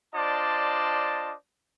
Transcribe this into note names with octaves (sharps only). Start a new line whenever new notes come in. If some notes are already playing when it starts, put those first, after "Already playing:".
D4 F4 C5 D5 D#5 A5